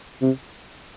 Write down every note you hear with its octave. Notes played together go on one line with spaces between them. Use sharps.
C3